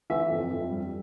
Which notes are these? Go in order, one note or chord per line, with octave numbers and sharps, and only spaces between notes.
E3 E5
F2
F2
G3